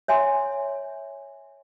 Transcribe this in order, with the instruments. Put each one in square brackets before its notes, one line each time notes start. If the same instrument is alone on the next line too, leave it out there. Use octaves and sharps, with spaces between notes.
[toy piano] C#5 E5 G#5 C6